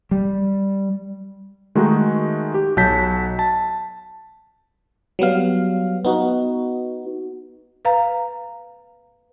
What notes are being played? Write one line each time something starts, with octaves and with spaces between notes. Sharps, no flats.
G3
D#3 G#3 A3 D#4 F#4
G4
B1 F#3 A5 G6 B6
A5
F#3 G3 B3 F5
B3 D#4 F#4
B4 F5 A#5